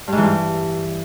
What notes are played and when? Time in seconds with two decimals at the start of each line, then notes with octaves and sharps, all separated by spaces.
0.07 G2
0.12 G#2
0.18 E3
0.23 G2